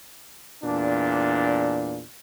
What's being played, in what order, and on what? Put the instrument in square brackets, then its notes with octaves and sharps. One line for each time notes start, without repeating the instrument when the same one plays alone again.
[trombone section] E2 A#2 D4